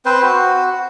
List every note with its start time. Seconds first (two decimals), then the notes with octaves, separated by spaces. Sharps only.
0.05 C4 B4 C5
0.23 F#4